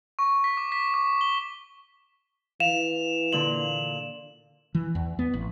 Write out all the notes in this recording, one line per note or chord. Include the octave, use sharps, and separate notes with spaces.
C#6
B6
D6
B6
D6
G7
E3 F5 E7 F7
A#2 D3 F#7
E3
E2
B3
A1